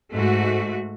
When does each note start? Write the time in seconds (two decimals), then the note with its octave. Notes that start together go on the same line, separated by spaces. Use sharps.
0.13 G#2 A3 F#4